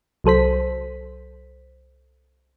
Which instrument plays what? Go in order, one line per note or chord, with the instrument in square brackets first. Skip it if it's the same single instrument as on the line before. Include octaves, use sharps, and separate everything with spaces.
[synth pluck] C2 F#3 A4 C5 B6